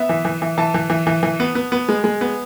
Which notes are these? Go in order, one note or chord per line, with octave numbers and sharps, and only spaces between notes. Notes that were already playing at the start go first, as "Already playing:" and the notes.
Already playing: B3 E5
E3
E3
E3
E3 A5
E3
E3
E3
E3
B3
B3
B3
G#3
G#3
B3